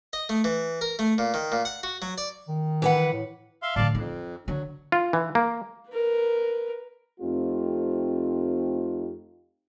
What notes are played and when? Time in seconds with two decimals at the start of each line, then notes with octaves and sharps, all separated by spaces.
0.13 D#5
0.29 A3
0.44 E3
0.81 A#4
0.99 A3
1.18 A#2
1.34 D#3
1.52 A#2
1.65 F#5
1.83 F#4
2.02 F#3
2.18 D5
2.49 D#3
2.82 E3 B4 F#5
3.13 A2
3.63 E5 F5 C6
3.76 A2 D3 D5 F5 A5
3.95 F2 D#4
4.48 D3 F#3 D4
4.92 F4
5.13 E3
5.35 A#3
5.90 A#4 B4
7.20 F2 A3 C4 D#4 F4 G4